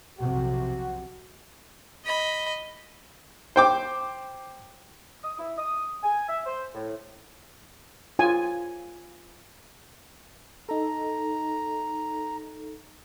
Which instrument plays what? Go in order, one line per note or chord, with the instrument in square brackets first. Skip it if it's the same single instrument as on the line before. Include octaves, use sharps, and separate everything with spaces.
[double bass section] B1 F2 C3 [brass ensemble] F#4
[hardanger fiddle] D#5 B5
[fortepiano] C5 G5 D6
[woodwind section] D#6
E4
D#6
G#5
E5
C5
A2
[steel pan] F4 G#5
[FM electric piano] D#4 A4 [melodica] A#5